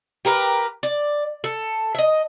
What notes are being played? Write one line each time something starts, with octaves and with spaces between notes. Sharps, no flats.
G4 A#4 B4
D5
A4
D#5 E5